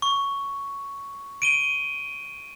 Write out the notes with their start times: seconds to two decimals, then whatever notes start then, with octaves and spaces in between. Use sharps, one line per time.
0.02 C#6
1.42 D7 D#7 G7